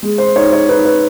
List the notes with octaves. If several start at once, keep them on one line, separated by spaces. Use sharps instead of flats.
G#3
C5
D#4 C#5
C#5
D#4 B4
B4